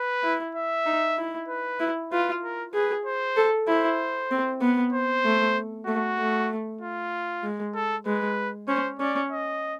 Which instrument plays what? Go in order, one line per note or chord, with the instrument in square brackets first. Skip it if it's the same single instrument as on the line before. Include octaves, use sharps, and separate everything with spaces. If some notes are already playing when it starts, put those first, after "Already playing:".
Already playing: [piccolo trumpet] B4
[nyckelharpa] E4
[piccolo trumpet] E5
[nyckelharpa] D#4
E4
[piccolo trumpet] B4
[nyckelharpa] E4
[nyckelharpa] F4 [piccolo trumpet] B4
[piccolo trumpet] A#4
[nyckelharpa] G#4 [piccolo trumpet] B4
[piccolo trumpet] C5
[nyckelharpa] A4
[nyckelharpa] E4 [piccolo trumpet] C5
[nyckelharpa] C4
B3
[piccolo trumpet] C5
[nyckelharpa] A3
[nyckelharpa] A3 [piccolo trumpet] F#4
[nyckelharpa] A3
[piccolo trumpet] F4
[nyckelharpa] G#3
[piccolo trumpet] A4
[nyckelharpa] G#3 [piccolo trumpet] B4
[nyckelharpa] C#4 [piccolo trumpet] C5
[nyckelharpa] C#4 [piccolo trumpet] D5
[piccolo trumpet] D#5